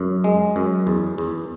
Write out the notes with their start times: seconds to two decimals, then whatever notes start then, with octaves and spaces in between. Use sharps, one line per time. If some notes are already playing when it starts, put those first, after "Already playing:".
Already playing: F#2
0.24 G#3
0.56 F#2
0.87 E2
1.18 E2